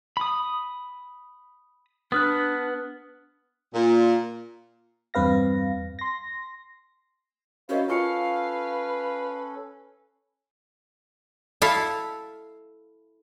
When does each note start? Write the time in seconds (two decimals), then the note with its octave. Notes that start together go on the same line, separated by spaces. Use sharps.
0.17 B5 D#6
2.12 B3 D4 B4 D#6 F6 F#6
3.74 A#2
5.14 E2 G2 C4 B4 F5 A#6
5.99 C6 A#6
7.69 C#4 E4 F#4 A#4 C5 D#5 F5
7.88 C#4 F4 A4 B4 F5 C#6 C#7
11.62 E4 A4 E5 F5